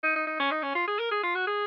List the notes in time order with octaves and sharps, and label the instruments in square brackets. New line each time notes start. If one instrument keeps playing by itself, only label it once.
[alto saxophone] D#4
D#4
D#4
C#4
D#4
C#4
F4
G#4
A#4
G#4
F4
F#4
G#4